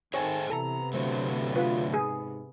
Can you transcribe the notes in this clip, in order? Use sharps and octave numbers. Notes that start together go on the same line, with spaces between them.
D#3 G#4 A4 C5 C#5 G5 G#5
C3 E3 B3 A4 G#5 A#5
D3 F#3 A3 C5
F4 B4
G#2 G#4